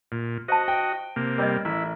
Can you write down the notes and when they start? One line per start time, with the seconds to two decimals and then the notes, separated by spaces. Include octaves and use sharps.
0.12 A#2
0.48 F#4 C5 D#5 F5 A5
0.68 G5
1.16 C3 A#3
1.38 G3 A#4 C#5 D#5
1.65 A1 E4